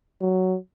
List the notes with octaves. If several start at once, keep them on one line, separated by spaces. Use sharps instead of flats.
F#3